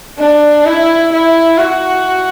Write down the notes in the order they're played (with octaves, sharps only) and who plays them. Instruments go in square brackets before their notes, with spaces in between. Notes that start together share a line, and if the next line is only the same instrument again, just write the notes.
[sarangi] D4
E4
E4
F#4